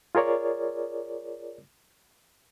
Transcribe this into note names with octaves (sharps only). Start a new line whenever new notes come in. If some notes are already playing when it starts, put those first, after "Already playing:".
F4 G#4 A#4 C#5 D5